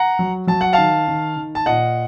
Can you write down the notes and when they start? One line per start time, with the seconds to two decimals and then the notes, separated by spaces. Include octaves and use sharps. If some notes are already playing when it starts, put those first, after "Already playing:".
Already playing: F#5 A#5
0.19 F#3
0.47 F#3 A5
0.61 F#5
0.73 D#3 F5 A5
1.08 D#3
1.36 D#3
1.55 A5
1.66 A#2 D#5 F#5